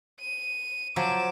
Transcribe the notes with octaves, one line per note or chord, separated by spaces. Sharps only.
D#7
F3 F#3 G#5 D6 E7